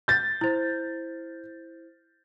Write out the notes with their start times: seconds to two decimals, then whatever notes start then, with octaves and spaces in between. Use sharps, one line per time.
0.08 G6 A6
0.41 E4 C5